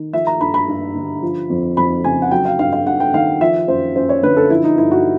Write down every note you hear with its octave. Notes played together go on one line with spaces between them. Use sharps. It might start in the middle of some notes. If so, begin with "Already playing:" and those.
Already playing: D#3
F3 E5
A#5
G2 B5
B5
G2
D3
F3
F2
F2 B5
C#3 G#5
F#5
F#3 G5
F5
G2 F5
F5
G2 F#5
G5
D#3 F5
F3 E5
F#2 C5
F#2 C5
C#5
D3 B4
A4
F3 E4
D#4
G2 E4
F#4